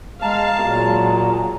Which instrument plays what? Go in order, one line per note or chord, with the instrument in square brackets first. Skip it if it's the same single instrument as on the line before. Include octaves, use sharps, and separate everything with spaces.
[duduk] G#3 [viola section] F5 [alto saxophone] A5 [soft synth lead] A#5
[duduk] A#2 [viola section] F#3 G#3